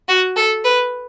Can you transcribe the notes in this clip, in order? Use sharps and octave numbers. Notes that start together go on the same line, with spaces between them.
F#4
A4
B4